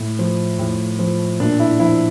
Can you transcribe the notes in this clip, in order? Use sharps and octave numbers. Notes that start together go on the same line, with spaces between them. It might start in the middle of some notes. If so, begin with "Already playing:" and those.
Already playing: A2
F3
A2
F3
A#2 D4
E4
F3 E4